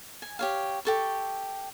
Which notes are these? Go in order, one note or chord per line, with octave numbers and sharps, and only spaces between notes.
G#5
G4 C#5 F5
G4 A4 C#6